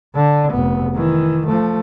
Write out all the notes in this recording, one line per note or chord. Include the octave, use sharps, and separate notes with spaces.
D3 D4
F1 B3
D#3 E3
F3 A3